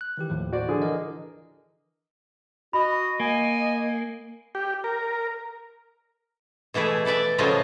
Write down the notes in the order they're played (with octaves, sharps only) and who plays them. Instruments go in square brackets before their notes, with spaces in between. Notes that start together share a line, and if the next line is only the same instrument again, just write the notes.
[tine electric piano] F#6
D#3 E3 G4
D#2 A2 F3
[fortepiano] F#4 C5 D5
D3 G#4
[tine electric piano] E3 A#4 D#5
[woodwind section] F#4 D#5 [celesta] B5
[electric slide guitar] A#3 [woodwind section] D#5 G#5
[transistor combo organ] G4
A#4
[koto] B2 E3 A3 E4 G#4
E4 A4 B4 D5 E5
A2 C#3 F3 F#3 F4 D#5